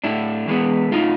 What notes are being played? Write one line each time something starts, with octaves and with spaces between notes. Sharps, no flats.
A2 D4 E4
E3 G#3 B3
A2 D#4 F4